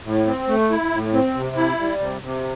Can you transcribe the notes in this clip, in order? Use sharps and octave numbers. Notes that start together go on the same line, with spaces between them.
A2
C4
A3
E4
A2
C4
C3
E4
G3
C3
C3